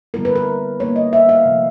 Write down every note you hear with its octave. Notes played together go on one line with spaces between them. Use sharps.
D3 G3 B3 E4 A#4
B4
A#4
G3 A#3 D#4 C#5
D#5
E5
F5
C3 F3 A3